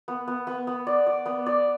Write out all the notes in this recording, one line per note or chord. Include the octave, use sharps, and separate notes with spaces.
B3
B3
B3
B3
D5
D5
B3
D5